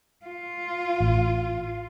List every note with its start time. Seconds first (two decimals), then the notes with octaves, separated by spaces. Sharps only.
0.26 F4
1.00 A1